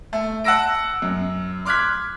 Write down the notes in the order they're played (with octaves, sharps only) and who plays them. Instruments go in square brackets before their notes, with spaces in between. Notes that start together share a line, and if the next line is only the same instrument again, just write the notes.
[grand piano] A3
F#5 A5 E6 A#6 D7
F#2
C6 D6 F6 F#6 G#6 B6